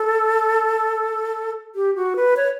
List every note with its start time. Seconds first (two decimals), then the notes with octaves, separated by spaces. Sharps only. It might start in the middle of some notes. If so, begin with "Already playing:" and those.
Already playing: A4
1.75 G4
1.96 F#4
2.16 B4
2.37 C#5